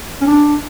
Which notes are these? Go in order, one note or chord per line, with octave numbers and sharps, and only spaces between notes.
C#4
D4